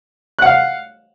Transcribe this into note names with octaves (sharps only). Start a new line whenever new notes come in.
F5 F#5 F#6